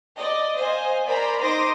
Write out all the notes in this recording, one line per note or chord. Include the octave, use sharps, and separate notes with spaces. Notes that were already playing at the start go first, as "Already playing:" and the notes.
D5 D#5
C5 D#5 F5 G#5
A#4 C5 D5 G#5 A#5 B5
D#4 C5 C6 D6 D#6 A#6